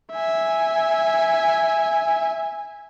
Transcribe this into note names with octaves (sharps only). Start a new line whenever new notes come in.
E5 G#5